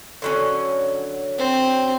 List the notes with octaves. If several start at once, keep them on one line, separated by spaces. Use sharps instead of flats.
D3 F#3 C#4
C4